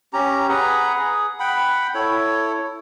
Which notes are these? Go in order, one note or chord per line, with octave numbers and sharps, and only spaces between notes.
C#4 G4 A#5
G#4 B4 F#5 A#5
G#4
F#5 G5 B5
E4 A4 C#5